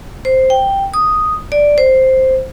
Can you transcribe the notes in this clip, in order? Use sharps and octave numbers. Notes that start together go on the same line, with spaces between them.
C5
G5
D#6
D5
C5